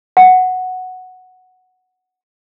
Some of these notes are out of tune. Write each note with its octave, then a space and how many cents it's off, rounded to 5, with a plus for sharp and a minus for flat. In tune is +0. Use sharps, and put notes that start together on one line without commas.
F#5 -5